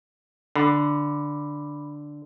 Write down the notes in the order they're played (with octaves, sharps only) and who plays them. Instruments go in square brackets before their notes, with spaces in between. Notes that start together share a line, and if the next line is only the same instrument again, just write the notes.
[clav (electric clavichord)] D3 [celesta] B5 D6